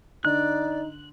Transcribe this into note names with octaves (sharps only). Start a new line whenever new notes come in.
D3 D#4 D5 F#6